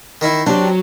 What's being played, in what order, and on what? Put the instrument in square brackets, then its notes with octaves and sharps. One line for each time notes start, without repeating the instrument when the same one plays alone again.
[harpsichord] D#3 D#4 E4
[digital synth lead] F#3 [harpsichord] C4 [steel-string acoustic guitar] D4 G4